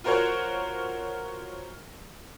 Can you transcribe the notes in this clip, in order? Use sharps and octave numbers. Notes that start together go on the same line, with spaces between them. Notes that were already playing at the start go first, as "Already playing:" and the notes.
F4 F#4 A#4 C5 C#5 F#5